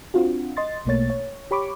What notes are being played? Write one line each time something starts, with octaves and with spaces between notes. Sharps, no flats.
C4 D4 F4 F#4
D#5 C6 A6
B1 B2 A3 A#3 C#5 A6
C#5
G4 C#5 B5 C#6 D6